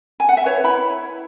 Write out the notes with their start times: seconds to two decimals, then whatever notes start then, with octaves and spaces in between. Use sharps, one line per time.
0.20 G#5
0.29 F#5
0.37 E5
0.45 B4 C#5
0.64 E4 B5